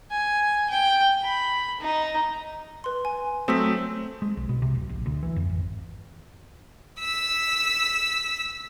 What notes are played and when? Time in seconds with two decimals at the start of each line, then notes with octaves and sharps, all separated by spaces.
0.11 G#5
0.70 G5
1.24 B5
1.80 D#4
2.84 B4 C6
3.05 G#5
3.48 F#3 A3 C4 D#6 E6 B6
4.22 G#3
4.37 B1
4.49 B2
4.62 C3
4.75 D1
4.89 A#1
5.06 D2
5.23 E3
5.36 F2
5.50 G#1
7.00 E6 B6